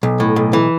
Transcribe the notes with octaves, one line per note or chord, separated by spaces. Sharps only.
B1
A2
B1
E3